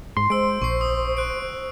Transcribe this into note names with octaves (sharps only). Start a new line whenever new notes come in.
G#2 C6
G#3 C5 E6 D7
A#1 C#6 C7
D#6
F#6 D7